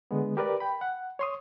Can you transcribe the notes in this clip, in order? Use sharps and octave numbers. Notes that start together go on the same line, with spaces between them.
D3 G#3 B3
G4 A#4 B4 D5
G5 B5
F#5
C#5 C6 D#6